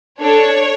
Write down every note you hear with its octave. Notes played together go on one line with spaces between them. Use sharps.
D4 A4 C#5